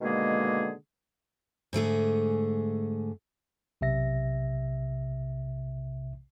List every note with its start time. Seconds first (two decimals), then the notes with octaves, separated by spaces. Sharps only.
0.01 B2 D3 D#3 G#3 A#3 G#4
1.73 G#2 D3 A3 G#4
3.81 B1 C3 E5 A#6